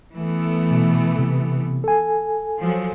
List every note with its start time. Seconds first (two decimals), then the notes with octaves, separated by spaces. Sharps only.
0.14 E3 A3 B3
0.71 B2
1.19 C3
1.84 A4 G#5
2.60 F3 F#3